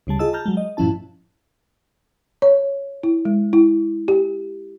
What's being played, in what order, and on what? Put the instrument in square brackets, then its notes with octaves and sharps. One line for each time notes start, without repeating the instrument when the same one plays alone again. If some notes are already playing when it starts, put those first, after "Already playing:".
[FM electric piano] D2 C#3 G3 A5
F4 G#4 D#5 A5 E6
A5 A#5 F6 G6
F#3 G#3
D#5
G2 A#2 F3 C#4 E4 A5
[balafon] C#5
E4
G#3
E4
G4